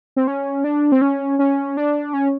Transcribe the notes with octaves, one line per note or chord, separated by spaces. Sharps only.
C4
C#4
D4
C4
C#4
C#4
D4
C#4